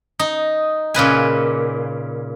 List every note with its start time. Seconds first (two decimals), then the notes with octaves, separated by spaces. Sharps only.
0.19 D#4
0.94 A#2 C#3 B4 G#5